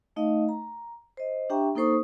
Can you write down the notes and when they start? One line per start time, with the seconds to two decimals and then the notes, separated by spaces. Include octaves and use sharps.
0.16 A3 D#4 D#5 F5
0.49 A#5
1.17 C5 D#5
1.50 D4 G4 E5 G5 A#5 C#6
1.75 A#3 D#4 A4 C5 C#6 D#6